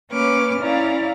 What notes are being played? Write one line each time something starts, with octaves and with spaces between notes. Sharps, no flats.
A#3 C#4 B4 C#5 D6 F6
C#4 E4 D5 F5 A#5